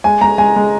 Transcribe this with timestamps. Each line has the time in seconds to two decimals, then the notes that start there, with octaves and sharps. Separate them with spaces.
0.04 G#3 G#5
0.21 G#3 A#5
0.38 G#3 G#5
0.56 G#3